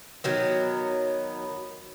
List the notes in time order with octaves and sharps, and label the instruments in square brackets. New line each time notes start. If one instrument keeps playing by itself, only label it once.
[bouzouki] D#3 F#3 B3